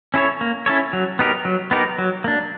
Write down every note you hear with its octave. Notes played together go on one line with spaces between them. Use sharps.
C#4 E4 A4 C#5
A#3
C#4 E4 A4 C#5
F#3
B3 D#4 G4 A#4
F#3
B3 D#4 G4 A#4
F#3
A#3 D4